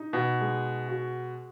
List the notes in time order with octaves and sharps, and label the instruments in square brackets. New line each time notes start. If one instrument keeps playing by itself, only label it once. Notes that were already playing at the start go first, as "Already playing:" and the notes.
Already playing: [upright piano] D#4
[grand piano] B2
[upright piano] G#3
F#4